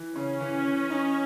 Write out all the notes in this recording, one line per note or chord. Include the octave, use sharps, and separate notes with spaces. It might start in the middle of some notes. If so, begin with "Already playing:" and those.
Already playing: E3
C#3 C#4
E3
E3
D#4